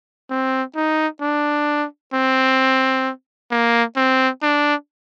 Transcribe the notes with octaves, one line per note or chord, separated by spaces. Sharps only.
C4
D#4
D4
C4
A#3
C4
D4